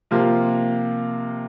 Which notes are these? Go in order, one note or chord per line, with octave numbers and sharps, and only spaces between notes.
C3 F3 A#3 F4